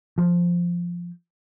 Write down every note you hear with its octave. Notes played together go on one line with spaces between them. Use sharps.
F3